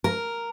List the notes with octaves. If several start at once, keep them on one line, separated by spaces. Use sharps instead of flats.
A#4